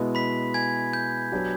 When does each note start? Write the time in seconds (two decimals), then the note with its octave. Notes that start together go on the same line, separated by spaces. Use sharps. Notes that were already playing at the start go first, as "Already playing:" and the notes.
Already playing: B2 G#3 B3 E4
0.15 B5 B6
0.54 G#5 G#6
0.93 G6
1.32 F#3 B3 D4 G4